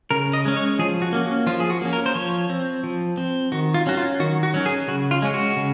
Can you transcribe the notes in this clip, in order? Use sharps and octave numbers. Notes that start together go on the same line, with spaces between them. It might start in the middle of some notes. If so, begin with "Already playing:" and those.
C#3 A#4
D#5
G#3 C#4
C#5
F3 G#4
F#4
A#3 C#4
F#4
F3 F4
G#4
F#4
A#3 C#4
A#4
C5
F3 C#5
C4
F3
C4
D#3 F#4
F4
F#3 C#4 F#4
F4
D#3 F#4
F#4
F#3 C#4
G#4
C#3 F#4
F4
G#3 C#4
F#4
C#3